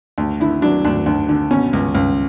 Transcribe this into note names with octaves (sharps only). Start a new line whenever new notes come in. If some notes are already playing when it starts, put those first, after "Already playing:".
D2
D3 E4
F#3 D4
D2 D4
D2
D3
B2 C#4
C#2
C#2